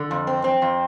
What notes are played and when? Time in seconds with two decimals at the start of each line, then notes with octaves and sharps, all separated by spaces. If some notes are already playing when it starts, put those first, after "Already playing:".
Already playing: D3
0.11 F2
0.27 C4
0.44 C4
0.62 F2